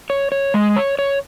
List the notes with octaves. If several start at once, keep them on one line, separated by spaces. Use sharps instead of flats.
C#5
C#5
G#3
C#5
C#5